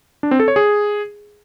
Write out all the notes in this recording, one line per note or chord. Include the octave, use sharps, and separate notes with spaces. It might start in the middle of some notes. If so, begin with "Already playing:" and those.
D4
C4
A4
C#5
G#4